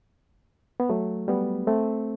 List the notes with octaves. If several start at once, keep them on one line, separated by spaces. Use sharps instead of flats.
B3
F#3 A3
G3 B3
A3 C4